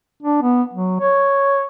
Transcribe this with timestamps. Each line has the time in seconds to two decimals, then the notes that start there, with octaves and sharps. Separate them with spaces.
0.23 D4
0.42 B3
0.73 F#3
1.01 C#5